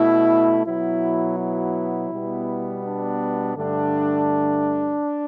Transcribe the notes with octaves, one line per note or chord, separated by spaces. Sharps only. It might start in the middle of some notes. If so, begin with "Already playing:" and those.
Already playing: B2 A3 E4
B2 F#3 B3 E4
E4
B2 G3 B3
D4
G2 D3 A3 D4